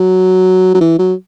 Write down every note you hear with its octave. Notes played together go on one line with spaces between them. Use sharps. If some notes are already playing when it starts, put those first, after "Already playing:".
Already playing: F#3
F#3
E3
F#3